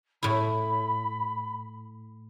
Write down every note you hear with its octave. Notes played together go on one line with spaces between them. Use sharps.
A2 E4 B5